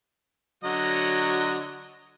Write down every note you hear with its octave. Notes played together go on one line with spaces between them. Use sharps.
D3 F#3 F#4 D#5